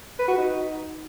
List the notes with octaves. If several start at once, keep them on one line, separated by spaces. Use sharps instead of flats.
B4
F#4
D#4